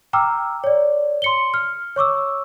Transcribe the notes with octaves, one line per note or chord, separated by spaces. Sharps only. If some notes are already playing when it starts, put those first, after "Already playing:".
G5 A#5 D6 E6 F6
C#5 D5
C6 C#7 G7
F6
C#5 C#6 D6 E6